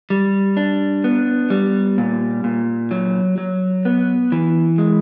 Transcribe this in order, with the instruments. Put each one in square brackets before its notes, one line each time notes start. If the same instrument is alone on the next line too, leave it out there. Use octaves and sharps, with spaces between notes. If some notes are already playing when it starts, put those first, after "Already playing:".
[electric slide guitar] G3
D4
B3
G3
A#2
A#2
F#3
F#3
B3
E3
G#3